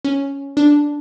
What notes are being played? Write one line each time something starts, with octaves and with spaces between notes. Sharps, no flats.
C#4
D4